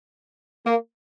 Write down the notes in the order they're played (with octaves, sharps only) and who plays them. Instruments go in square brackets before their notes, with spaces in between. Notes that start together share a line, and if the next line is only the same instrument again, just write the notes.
[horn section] A#3